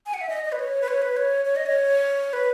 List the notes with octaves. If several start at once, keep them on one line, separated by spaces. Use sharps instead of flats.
G#5
F#5
E5
D#5
D#5
B4
C#5
B4
C#5
B4
C#5
C#5
D#5
C#5
B4